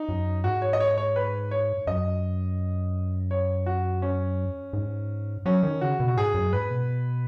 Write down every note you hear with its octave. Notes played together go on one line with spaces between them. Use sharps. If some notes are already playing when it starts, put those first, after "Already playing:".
Already playing: D#4
F#2
G#2 F#4
C#5
D#5
C#5
C#5
B4
C#5
F#2 D#5
C#5
F#4
C#4
G#2
F#3 C#4
D#3
C#3 F#4
B2
F#4
G#2 G#4
F#2
G#2 B4
B2